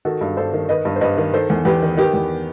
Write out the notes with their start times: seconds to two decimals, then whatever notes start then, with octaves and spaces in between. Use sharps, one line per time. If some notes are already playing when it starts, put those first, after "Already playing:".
0.05 D#3 F#4 A4
0.21 G2
0.37 G2 A4 C5
0.54 D#3
0.69 D#3 B4 D#5
0.85 G2
0.96 C5
1.01 G2 B4 D#5
1.18 D#3
1.33 D#3 A4 C5
1.50 E2
1.65 E2 G4 B4
1.82 D#3
1.97 D#3 G4 B4
2.14 E2